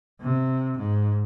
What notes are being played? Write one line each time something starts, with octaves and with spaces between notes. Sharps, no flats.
C3
G#2